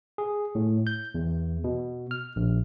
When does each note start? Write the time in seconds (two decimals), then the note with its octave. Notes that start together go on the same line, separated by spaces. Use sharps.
0.18 G#4
0.55 A2
0.87 G6
1.15 E2
1.64 B2
2.11 F6
2.36 A#1